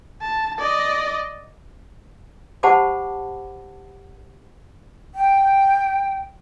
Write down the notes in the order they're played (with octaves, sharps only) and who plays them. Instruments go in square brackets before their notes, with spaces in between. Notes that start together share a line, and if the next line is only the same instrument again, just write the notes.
[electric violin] A5
D5 D#5
[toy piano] G4 C5 F#5 A5 B5 D6
[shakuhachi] G5